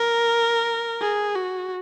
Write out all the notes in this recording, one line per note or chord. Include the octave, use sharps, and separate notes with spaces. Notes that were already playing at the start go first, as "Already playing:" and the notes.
Already playing: A#4
G#4
F#4